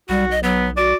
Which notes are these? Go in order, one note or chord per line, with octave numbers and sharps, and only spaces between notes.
B1 G3 F#4
D#5
F#3 B3
F#4 D5